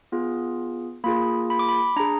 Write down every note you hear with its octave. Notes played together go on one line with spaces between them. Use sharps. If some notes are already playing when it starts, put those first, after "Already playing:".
B3 F4 G#4
A#3 F4 G#4 B5
B5
D6
B5
D4 G#4 A#5